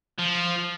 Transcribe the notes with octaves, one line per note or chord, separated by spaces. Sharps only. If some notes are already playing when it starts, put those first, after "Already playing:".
F3